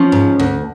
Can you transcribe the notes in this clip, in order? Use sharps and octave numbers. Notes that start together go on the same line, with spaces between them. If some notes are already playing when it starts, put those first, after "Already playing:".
Already playing: F3 C#4
G#2
D2